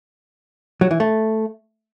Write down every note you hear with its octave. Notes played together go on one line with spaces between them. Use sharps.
F#3
E3
A3